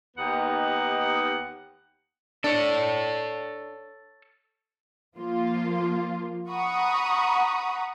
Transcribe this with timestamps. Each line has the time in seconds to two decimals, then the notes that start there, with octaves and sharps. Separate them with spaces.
0.17 D#2 B3 D#4 G4 F#5
2.44 D4 A4 C#5
5.16 F3 A#3 F4
6.51 F#5 A#5 B5 C#6 D#6